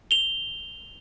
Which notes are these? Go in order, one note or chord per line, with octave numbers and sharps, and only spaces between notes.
F7 G7